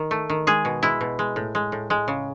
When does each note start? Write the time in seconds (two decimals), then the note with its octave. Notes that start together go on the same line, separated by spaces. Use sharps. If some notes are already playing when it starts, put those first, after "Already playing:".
Already playing: D#3
0.11 A3
0.30 D#3
0.47 G#3 G#4
0.65 B2
0.83 G#3 E4
1.01 B2
1.19 G#3
1.36 A2
1.55 G#3
1.72 A2
1.90 G#3
2.08 C#3